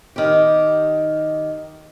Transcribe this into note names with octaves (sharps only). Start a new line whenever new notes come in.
D#3 G4